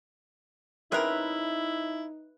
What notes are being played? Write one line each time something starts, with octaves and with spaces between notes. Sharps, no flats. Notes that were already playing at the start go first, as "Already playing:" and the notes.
C#3 C4 D#4 E4 A#4 B4 E5 F#6